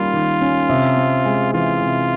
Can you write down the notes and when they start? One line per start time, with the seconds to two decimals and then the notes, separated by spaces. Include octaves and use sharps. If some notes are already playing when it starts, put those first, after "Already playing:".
Already playing: D#3 G3 A#3 C#4 F4
0.13 D#3
0.41 C#4
0.69 C3
0.97 C4
1.25 G#3
1.53 E3 F4
1.82 C3